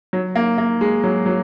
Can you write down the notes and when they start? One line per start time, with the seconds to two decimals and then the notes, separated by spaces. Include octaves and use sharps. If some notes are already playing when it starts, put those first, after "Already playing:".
0.13 F#3
0.36 A#3
0.58 A#3
0.81 G#3
1.04 F#3
1.26 F#3